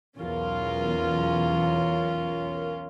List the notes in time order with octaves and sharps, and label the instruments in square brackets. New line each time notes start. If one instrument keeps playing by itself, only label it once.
[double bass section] B1 E2 [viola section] C#4 F4 A#4